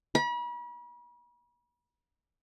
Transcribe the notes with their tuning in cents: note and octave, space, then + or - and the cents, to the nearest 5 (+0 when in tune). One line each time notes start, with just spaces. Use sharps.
B5 -40